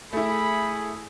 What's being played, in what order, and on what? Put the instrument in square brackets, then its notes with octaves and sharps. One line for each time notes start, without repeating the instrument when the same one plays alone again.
[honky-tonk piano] A3 E4 [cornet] G#4 [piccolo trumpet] B5